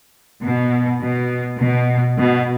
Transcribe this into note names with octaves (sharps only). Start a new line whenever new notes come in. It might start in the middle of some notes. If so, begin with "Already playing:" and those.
B2
B2
B2
B2